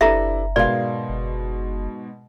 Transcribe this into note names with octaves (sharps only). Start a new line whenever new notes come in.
F#1 D4 E4 G4 A4 B4 E5 A#5
G#2 B2 A#4 D5 F5 C6
F#1